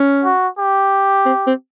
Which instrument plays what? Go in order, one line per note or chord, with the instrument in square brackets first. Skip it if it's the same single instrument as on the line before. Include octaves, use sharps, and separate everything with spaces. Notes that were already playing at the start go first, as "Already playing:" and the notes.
Already playing: [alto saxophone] C#4
[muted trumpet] F#4
G4
[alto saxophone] C4
C4